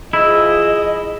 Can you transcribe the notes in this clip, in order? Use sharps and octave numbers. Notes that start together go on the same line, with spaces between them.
F3 E4 G#4 D#5